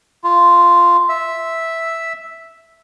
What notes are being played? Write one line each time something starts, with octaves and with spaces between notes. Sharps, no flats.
F4
E5